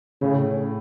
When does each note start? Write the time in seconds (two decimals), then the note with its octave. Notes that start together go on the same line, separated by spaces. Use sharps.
0.21 A2 C#3